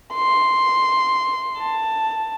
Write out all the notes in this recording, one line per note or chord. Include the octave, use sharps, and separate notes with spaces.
C6
A5